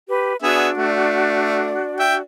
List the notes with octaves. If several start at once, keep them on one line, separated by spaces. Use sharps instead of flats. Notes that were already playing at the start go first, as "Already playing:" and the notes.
G4 B4
B3 D4 F#4 G#4 D5 E5
A3
E5 G5